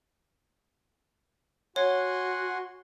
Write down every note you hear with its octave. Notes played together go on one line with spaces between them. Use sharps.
F#4 C#5 F#5 G#5 C6